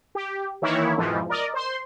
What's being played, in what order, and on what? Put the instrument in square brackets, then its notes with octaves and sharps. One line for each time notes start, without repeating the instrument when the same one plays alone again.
[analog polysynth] G4
D#3 E3 A#3 E4 C#5
F2 G#2 B2 E3 F3
A#4 D5 D#5
C5 C6